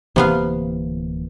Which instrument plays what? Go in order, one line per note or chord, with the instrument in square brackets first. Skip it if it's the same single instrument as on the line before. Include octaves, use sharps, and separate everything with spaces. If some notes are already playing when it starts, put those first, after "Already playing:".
[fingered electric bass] D1 E3 A#3 [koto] C3 B3 F5